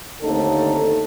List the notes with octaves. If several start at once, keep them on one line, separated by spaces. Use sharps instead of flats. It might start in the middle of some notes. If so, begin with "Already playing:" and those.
D#2 D3 A3 C4 D#4 A4